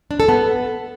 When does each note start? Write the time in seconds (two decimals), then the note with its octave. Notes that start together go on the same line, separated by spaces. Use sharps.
0.11 D4
0.20 A4
0.29 B3